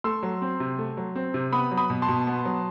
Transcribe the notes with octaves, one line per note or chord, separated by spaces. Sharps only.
A3 C6 E6
F#3
C4
C3
A3
F#3
C4
C3
B3 B5 D#6
F#3
B5 D#6
B2
A5 C6
B2
B3
F#3